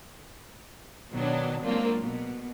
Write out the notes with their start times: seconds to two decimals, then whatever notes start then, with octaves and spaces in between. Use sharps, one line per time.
1.12 B2 D#3 F#3 B3 D4
1.65 F#3 G#3 A#3 C4 D4 F4
2.02 B2